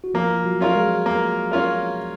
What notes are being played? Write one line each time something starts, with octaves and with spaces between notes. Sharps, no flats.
F#4
F3 A#3 F4
F4
F#3 F#4
C#4 F4 A#4
G#3 G#4
A#3
C#4 F4 A#4